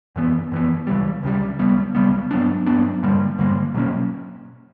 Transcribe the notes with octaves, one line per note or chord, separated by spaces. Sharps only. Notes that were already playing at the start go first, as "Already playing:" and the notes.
F#2 E3 B3
F#2 E3 B3
C#2 C#3 E3 G3
C#2 C#3 E3 G3
C#2 C#3 G3 B3
C#2 C#3 G3 B3
G2 F#3 B3 D4
G2 F#3 B3 D4
G2 D3 G3 A#3
G2 D3 G3 A#3
B2 F#3 A#3 C#4